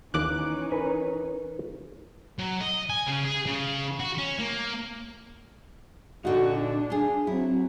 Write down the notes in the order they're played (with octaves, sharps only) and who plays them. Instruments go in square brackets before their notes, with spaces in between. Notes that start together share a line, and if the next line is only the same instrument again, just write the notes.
[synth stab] D#2 D6 F#6 [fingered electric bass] E3 [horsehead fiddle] C#4 D#4
[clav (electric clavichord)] A#4 B4 G#5
[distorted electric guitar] F#3
D#5
G#5
C#3
G#4
C#3
F#4
C#4
A#3
[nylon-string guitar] A#2 D3 D#4 [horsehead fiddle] F#4
[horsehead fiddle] D4
[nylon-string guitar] F4 G#4
[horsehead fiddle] F#3 C4 [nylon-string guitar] E4